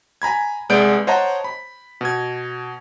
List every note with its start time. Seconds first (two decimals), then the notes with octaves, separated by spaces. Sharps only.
0.22 G#5 A#5 B5 G#6
0.69 C2 G#3 B3 D5 G6 D7
1.07 C5 C#5 D#5 F#5 A5 A#5
1.44 B5
2.01 B2 G#6